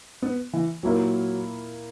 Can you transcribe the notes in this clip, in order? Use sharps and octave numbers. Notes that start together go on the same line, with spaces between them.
B3
E3
A#2 F#3 A#3 E4 A#4